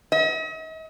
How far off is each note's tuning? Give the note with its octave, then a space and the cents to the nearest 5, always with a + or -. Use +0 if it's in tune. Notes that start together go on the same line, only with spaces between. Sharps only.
D#5 +45